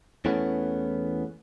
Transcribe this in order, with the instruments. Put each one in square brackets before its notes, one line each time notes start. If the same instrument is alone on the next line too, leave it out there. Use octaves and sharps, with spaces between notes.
[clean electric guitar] E2 E3 A3 B3 C#4